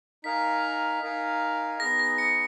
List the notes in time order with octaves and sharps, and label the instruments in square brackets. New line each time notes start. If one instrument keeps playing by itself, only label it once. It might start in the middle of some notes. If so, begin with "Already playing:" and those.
[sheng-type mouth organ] D#4 A#4 F5 G#5 [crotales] B6
[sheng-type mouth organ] D#4 A#4 F5 G#5
[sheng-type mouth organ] B3 D#4 G#4 [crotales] A#6
[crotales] A#6
C#7